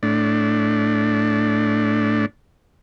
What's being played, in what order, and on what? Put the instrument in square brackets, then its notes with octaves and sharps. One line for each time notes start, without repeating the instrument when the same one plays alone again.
[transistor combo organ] A2 D4